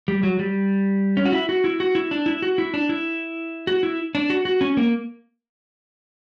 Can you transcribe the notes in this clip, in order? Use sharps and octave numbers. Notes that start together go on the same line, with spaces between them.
G3
F#3
G3
C#4
F#4
E4
F#4
E4
F#4
E4
D4
E4
F#4
E4
D4
E4
F#4
E4
D4
F#4
F#4
C#4
A#3